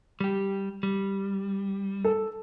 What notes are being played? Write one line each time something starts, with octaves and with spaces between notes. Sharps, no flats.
G3 G4
G3
A4